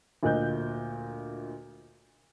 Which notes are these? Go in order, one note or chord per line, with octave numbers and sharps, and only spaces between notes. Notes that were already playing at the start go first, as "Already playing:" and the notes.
D2 A#2 D#5 F#6 G6